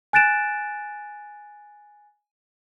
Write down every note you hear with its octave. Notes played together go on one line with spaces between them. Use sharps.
G#5 F#6 A6 D7 E7